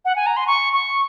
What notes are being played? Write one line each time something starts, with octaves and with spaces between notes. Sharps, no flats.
F#5
G#5
A#5
C6
C#6
C#6